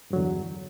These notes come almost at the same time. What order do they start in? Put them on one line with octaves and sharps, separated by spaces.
G2 F#3 D3 E2